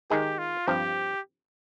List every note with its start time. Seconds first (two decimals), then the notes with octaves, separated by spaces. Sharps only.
0.10 D#3 G#3 D#4 G4 G#4
0.39 F4
0.67 G2 F3 C4 G4